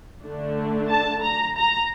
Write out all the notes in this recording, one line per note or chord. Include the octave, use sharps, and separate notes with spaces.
D3 A3 D4
A5
A#5
A#5